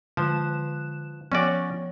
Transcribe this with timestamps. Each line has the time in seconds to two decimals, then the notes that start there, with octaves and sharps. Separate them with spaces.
0.17 D3 F3 F#6 E7
1.32 F3 C#4 F#4 C#5 D5